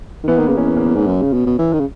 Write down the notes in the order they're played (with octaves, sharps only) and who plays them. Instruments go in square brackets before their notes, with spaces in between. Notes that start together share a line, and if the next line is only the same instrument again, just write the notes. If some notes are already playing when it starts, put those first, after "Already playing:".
[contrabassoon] D#3
[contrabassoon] E3 [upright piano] B3
[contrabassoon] D#3 [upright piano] A#3
[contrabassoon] C#3 [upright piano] B3
[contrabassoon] E2 [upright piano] C#4
[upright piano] B3
A#3
B3
[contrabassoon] G#2 [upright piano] C#4
[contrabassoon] F#2
C#3
B2
B2
E3
D#3
C#3